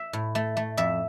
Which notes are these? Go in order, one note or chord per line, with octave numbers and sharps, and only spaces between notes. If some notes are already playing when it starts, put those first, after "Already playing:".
Already playing: E5
A2
A3
A3
F2 E5